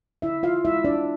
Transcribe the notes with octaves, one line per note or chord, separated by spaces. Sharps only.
D3 E4 E5
F4 F5
G#3 E4 E5
D4 D5